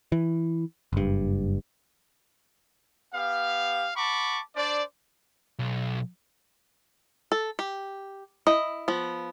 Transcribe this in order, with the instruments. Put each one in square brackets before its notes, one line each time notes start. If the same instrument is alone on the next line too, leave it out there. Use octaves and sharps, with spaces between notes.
[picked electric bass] E3
F#1 G2
[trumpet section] B3 G4 F5
F#5 A5 B5 C#6 D6
D4 C5 D5
[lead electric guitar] B1
[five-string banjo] A4
G4
E4 D#5
F3 B3